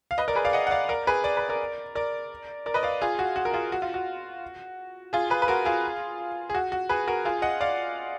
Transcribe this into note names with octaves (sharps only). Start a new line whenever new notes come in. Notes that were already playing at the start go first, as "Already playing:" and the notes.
F5
B4 D#5
A#4 D5
G#4 B4
D5 F5
D#5 F#5
F#5
D5 F5
A#4 D5
G#4 B4
D5
B4
A#4 D5
A#4 D5
A#4 D5
B4 D#5
D5 F5
F4 G#4
F#4
F#4
A#4
F4 G#4
F#4
F4
F#4
F4 G#4
G#4 B4
B4
F#4 A#4
F4 G#4
G#4
F#4
F#4
G#4 B4
F#4 A#4
F4 G#4
D#5 F#5
D5 F5